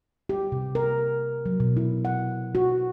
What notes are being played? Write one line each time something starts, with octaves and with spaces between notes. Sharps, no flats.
G4
C3
A#4
F#3
B2
E4
F#5
F#4